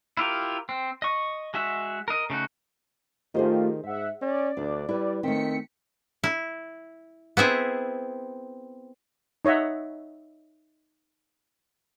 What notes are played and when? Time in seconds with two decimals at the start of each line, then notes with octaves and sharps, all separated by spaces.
0.17 E4 F4 G4 A#4
0.69 C4
1.02 D#5 C#6
1.54 G#3 F#4 E5
2.08 A#4 D#5
2.30 C#3 A3 D#4 F#4
3.34 D#3 A3 F4 G4 G#4 C5 D#5
3.83 G#2 E5 F#5
4.21 C#4 D5
4.57 D2 D4
4.89 G3 E4 B4
5.23 D#3 A3 C4 B6 C#7
6.24 E4
7.37 B3 C4 E4 G#4
9.45 D#4 C#5 D#5 E5 F#5